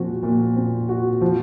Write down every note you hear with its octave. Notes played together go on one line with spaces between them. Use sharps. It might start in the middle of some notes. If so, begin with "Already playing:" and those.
Already playing: A#2 F3 C4 F#4
A#2
C4
F#4
F3